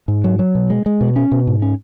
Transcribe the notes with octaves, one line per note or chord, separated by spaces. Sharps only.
G#2
F#3
F#3
B2
G#3
G#3
B2
C#4
B2
G#2
C#4